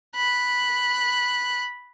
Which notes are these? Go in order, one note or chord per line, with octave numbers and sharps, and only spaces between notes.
B5 F#6